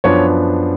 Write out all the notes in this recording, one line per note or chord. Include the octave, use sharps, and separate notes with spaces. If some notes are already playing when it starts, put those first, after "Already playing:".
F#2 F3 B3 D4 C#5